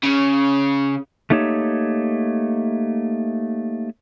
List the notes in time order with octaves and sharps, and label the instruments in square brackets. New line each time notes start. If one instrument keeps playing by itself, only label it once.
[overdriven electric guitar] C#3
[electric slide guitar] A3 A#3 D#4 G4 C#5 E5